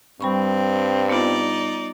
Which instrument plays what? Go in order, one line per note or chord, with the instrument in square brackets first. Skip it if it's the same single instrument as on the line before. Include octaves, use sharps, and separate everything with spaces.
[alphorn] G2 [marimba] G3 B5 C#6 [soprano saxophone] C4
[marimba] B3 F4 [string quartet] D#4 D5